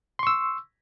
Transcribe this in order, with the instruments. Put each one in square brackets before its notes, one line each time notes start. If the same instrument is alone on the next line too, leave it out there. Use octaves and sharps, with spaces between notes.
[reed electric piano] C6
C#6
E6